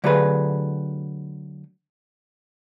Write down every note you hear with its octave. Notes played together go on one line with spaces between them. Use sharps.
D3 F#3 A3 G4 G#4 B4